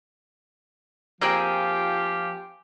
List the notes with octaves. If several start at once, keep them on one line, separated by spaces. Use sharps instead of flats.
F3 A#3 C4 F4 G4 G#4